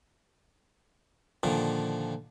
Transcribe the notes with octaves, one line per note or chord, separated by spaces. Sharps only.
A#2 D3 D#3 F3